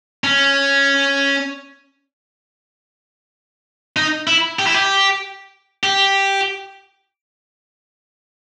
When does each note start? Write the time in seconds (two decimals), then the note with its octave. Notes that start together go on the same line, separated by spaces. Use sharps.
0.24 C#4
3.96 D#4
4.27 E4
4.59 G4
4.67 E4
4.74 G4
5.83 G4